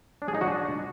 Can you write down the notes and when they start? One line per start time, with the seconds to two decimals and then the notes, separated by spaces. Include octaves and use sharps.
0.22 D4
0.28 G#4
0.35 D#4
0.41 F#4
0.48 D4